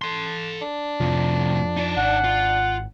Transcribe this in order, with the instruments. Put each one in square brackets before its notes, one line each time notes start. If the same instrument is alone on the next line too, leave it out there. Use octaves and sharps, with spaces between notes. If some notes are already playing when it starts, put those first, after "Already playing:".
[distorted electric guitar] A4 C6
[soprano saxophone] D4
[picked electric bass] F2 F3 [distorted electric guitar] A2 C3
[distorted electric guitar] D#4 D5
[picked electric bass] G#1 [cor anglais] F#5
[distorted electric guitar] F4